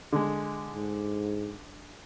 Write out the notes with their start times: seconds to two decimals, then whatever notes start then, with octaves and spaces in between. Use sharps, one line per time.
0.13 D3 G#3
0.73 G#2